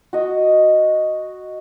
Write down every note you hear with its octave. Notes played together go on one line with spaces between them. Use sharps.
F#4 D#5